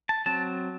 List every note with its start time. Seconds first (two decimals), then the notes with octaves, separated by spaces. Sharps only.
0.09 A5
0.26 F#3 C4 A5